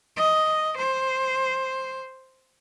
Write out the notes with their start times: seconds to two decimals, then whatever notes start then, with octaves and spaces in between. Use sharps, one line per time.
0.16 D#5
0.77 C5